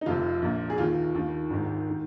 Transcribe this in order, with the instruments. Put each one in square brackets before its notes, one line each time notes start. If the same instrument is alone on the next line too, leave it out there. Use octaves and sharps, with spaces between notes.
[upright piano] D#4
F1 F2 C3 F4
A#1 A#2
G#4
D#2 D#3 F4
D#2 D#3
G#1 G#2 D#3
D#3